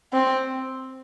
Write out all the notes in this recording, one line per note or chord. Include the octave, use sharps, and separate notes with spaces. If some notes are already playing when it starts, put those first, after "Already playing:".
C4